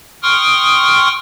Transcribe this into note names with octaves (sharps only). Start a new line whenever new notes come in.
G5 C6 C#6 D#6 F6